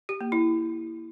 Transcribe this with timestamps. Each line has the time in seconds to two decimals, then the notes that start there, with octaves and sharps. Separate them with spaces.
0.09 G4
0.21 A#3
0.32 E4